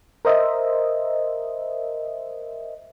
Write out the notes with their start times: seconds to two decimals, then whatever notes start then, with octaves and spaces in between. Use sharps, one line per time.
0.25 A#4 C5 D#5 E5